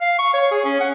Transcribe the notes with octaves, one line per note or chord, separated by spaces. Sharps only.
F5
C#6
C#5
G#4
C#4
F#5